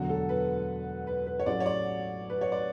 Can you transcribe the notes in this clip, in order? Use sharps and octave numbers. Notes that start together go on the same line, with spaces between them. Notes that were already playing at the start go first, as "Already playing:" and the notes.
Already playing: E1 D2 D3 F#3 F#4
A4
B4
B4
B4
C#5
A1 A2 F#3 A3 D5
C#5
D5
B4
C#5
D5